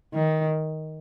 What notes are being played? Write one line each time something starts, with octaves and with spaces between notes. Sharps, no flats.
D#3